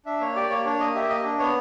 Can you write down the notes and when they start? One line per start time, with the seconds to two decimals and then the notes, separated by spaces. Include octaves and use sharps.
0.05 D4 E5
0.21 A#3 C#5
0.36 G4 D5
0.50 A#3 C#5
0.66 D4 C#5
0.80 A#3 D#5
0.95 G4 E5
1.09 A#3 D#5
1.24 D4
1.39 B3 C#5